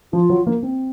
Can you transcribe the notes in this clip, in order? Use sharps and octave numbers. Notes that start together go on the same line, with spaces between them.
F3 F4
F#3
A#3
C4